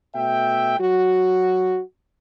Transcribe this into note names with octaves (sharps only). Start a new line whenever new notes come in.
B2 A3 E5 G5
F#3 F#4